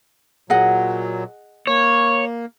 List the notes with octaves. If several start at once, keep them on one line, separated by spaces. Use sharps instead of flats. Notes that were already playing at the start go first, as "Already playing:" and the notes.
A#2 F#3 G#4 D#5 F#5
A#3 C#5